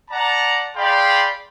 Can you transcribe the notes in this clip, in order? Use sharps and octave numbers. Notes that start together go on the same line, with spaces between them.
D5 F#5 A5 A#5
G#4 D5 F5 G5 B5 C6